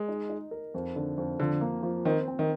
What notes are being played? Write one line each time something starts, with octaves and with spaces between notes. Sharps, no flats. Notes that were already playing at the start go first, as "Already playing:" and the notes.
Already playing: G#3
D#4
D#4
A#4
F2
D3
F2
D3 F3
A#3
F3
D#3 C4
C4
D#3